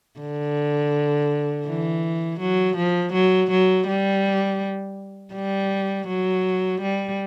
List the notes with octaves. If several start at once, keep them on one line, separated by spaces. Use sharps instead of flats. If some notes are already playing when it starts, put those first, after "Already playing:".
D3
E3
F#3
F3
F#3
F#3
G3
G3
F#3
G3